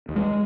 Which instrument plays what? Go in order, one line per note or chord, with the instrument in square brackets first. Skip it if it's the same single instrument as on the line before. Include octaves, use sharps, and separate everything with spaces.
[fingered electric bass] D#2
G#3